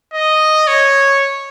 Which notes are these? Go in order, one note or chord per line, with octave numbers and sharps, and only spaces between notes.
D#5
C#5